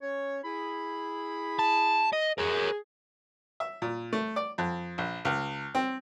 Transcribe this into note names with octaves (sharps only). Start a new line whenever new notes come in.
C#4 C#5
E4 G#4 B5
A5
D#5
G#4 A#4 C#5
E5
A#2
A3
D5
F2
A#1
C#2
C4